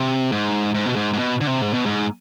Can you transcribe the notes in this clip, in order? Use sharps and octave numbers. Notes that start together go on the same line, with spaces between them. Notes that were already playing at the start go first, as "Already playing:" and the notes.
Already playing: C3
G#2
G#2
B2
G#2
G#2
B2
D3
C3
G#2
B2
G#2